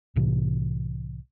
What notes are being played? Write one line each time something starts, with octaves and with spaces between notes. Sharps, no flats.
C2 A2 C3 E3